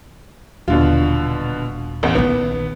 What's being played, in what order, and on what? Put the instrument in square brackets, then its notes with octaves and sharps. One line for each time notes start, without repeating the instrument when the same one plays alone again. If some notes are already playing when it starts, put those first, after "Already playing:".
[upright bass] D#1 [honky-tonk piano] B2 D3 F4
[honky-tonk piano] A1 E2
[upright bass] A#1 D#3 [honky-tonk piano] B3